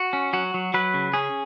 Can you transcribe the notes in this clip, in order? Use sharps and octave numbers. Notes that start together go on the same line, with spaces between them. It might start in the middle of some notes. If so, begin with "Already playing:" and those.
Already playing: F#4
C#4
F#3 F#4
F#3
F#3 B4
C#3
C#4 G#4